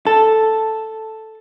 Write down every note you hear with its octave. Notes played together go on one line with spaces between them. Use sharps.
A4